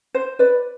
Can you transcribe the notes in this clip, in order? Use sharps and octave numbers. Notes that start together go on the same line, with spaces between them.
C5
B4 D5